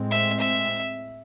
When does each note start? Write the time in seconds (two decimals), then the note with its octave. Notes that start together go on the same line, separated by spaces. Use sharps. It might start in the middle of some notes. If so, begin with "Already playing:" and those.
Already playing: A2 G#3 C4
0.11 E5
0.40 E5